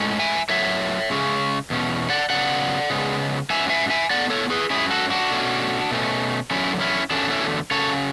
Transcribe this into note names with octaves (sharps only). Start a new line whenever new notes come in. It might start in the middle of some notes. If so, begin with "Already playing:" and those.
Already playing: A2 G#3 C#4
E5 G#5
A2 F#3 B3 C#5 E5
C#3 G#3 C#4
E2 B2 C#4
D5 F#5
C#3 F#3 B3 D5 F#5
C#3 G#3 B3
G#2 F#3 C#4 E5 G#5
E5 G#5
E5 G#5
A2 G#3 B3 D5 F#5
A4 C#5
G#4 B4
G#2 F#3 C#4 E4 G#4
F#4 A4
D4 F#4
B2 A3 C#4
B2 A3 C#4
E2 D3 F#3 C#4 E4
C#4 E4
E2 D3 F#3 A3 C#4 D4
C#4 E4
C#3 F#3 C#4 A4 C#5